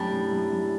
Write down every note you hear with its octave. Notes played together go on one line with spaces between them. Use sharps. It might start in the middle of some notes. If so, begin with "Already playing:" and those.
Already playing: F#2 A2 G3 D4
F#2
F#2
F#2